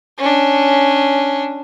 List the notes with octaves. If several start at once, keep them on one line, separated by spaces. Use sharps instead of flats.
C#4 D4